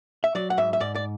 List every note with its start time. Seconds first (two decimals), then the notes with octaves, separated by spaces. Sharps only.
0.24 E5
0.35 F#3 D5
0.50 F#5
0.58 G#2 E5
0.73 E5
0.80 G#2 D5
0.95 D5